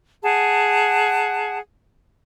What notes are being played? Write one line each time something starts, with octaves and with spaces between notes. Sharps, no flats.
G#4 F#5 A5